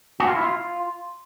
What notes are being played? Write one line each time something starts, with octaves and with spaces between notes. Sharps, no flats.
F#4
F4
E4
F4